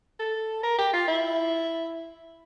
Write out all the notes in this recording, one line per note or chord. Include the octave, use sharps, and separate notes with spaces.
A4
A#4
G4
F4
E4